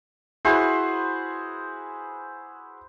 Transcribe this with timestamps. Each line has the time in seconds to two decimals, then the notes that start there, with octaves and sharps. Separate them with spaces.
0.45 E4 F#4 G#4 B4 C5